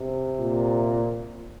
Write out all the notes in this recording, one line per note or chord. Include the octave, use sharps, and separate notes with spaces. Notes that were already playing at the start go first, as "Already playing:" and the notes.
Already playing: C3
A#2